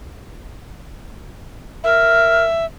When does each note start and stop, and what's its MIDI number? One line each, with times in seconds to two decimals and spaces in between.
1.84 2.44 70
1.84 2.65 76